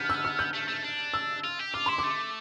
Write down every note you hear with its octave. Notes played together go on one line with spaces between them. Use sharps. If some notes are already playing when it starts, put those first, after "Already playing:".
Already playing: B3 F6 G6
E6
F6
G6
A3
A3
D4
E6
F4
G4
F4 D6
E4 C6
D6
A3